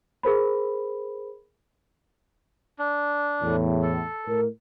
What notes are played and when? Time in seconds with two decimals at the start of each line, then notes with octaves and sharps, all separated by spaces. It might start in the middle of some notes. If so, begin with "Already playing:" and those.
0.23 G#4 A#4 C5 B5
2.79 D4
3.42 E2 A2
3.83 A4
4.27 A2 A#4